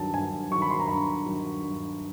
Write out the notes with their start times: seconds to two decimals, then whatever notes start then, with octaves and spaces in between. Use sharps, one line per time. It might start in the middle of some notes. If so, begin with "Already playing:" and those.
Already playing: G2 D#3 F#3 A5
0.14 G2 G#5
0.51 D#3 F#3 C#6
0.62 B5
0.71 C6
0.80 A#5
0.88 G2 B5
1.26 D#3 F#3
1.63 G2